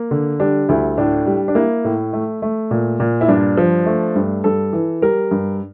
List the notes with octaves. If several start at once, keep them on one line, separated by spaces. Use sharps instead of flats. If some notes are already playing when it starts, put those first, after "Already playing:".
Already playing: A#3
D3
G3 D4
D2 E4
A2 D4
G3
D4
A#3 E4
A2
A3
A3
A#2
A#2
E4
G2 D4
F3
A3
G2
G2 A4
E3
G3 A#4
G2